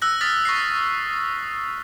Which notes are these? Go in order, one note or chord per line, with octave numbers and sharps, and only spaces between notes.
E6 F#6 A#6
D#6 F6 A6 B6
C#6 A#6 C7
D#6